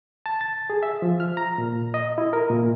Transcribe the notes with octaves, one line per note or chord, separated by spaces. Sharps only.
A5
A6
G#4
E5
F3
F6
A#5
A#2
D#5
E4
A#4
A#2